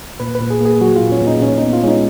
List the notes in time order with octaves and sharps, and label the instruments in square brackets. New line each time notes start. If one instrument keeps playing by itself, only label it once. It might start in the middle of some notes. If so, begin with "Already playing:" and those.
[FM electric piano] A#2 B4
B4
A#2
G#4
A#3 G#4
F#3 F#4
F4
A#2
C#4
A#2
D#4
A#2 C#4
B3 D#4
F4
G#3 C#4 D#4